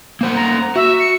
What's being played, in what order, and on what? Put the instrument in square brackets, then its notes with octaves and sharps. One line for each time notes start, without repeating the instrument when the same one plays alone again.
[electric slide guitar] A#3 C5 F#5
[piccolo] A#5
[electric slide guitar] F#4 [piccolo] E5
[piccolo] C#7